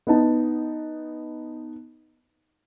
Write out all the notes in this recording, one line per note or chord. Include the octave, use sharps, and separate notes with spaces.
B3 D#4 A5